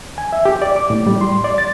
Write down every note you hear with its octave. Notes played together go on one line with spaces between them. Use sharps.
G#5
E5
G4
D5
D6
A2
G3
C6
D5
A6